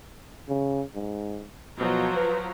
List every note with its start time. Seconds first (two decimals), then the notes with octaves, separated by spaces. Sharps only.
0.49 C#3
0.95 G#2
1.79 B2 F3 F#3 A#5
2.16 B4